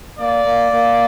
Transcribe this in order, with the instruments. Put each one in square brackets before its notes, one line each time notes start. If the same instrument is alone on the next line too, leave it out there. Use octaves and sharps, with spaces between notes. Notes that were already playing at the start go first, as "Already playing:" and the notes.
[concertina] A#3 [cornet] D5
[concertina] A#3
A#3